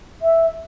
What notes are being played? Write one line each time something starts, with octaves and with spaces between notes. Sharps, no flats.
E5